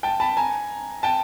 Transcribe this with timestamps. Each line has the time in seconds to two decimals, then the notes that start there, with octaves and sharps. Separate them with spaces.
0.03 G5 A5
0.20 A5 B5
0.37 G#5 A#5
1.03 G5 A5